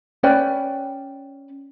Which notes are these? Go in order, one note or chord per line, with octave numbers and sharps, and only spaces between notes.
C#4 B4 D5 G5